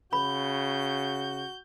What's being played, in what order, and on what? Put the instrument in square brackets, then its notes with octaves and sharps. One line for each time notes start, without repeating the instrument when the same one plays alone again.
[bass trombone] C#3 [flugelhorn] F#4 [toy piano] B5 [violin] G6